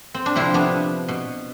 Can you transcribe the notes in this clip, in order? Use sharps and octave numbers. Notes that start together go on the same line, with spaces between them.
C4
D4
C3 F3 C4 E4
B3 D4
B2